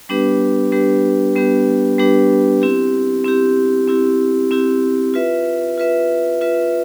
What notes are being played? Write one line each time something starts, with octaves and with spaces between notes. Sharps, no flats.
G3 B3 D4 G4 B4
G3 B3 D4 G4 B4
G3 B3 D4 G4 B4
G3 B3 D4 G4 B4
C4 E4 G4
C4 E4 G4
C4 E4 G4
C4 E4 G4
F4 B4 E5
F4 B4 E5
F4 B4 E5